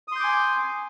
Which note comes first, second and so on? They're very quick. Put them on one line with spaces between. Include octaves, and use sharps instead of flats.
D#6 C6 G6 D6 G#5